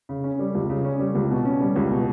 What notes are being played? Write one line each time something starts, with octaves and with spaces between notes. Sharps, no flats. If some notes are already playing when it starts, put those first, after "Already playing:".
C#3
C#4
G3
C#2
C#3
C#4
G3
C#2
B2
C#4
G3
C#2
B2